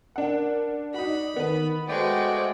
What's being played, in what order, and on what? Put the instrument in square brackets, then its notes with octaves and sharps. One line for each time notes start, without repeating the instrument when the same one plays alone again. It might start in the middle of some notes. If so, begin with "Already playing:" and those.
[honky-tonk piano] D4 F#5 [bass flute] A#4
[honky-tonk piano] D#4 F#4 [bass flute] D5 [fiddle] B5
[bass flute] D#3 [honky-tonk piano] B3 B4
[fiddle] G#3 F#4 [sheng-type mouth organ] A3 D5 G5 [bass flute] C5